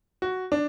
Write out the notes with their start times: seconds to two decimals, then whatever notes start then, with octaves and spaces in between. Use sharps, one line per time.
0.22 F#4
0.52 D4